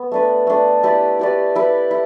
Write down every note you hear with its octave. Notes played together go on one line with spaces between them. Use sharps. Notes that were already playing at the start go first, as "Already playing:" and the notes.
Already playing: B3
A3 D4 B4
A3 D4 B4
E4 G4 B4 D5
E4 G4 B4 D5
E4 G4 B4
E4